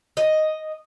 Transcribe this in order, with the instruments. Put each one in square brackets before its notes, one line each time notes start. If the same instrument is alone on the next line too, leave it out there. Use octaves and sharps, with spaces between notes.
[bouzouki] D#5